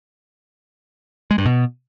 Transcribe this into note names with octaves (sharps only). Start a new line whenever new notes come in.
G#3
G2
B2